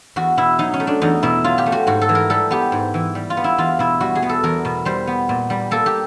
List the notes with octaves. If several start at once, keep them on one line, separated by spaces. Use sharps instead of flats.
E2 F#4
B2 E4
F#3 D#4
C#4
A3
D4
E2 D#4
B2 E4
F#3 F4
G4
A3
F#4
G#2 F#4
A4
E3
A#4
G3 A4
B3 G4
G#2
E3
G3
F4
B3
E4
E2 F4
B2 E4
G3 F#4
G#4
B3
A4
E2 A#4
B2
G3 C5
B3
A#2
G3
A#3 A4
G4